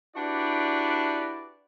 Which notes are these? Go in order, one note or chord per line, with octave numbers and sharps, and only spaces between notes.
D4 E4 F#4 G4 B4 D5